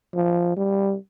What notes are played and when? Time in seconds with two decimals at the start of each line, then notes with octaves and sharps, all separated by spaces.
0.15 F3
0.57 G3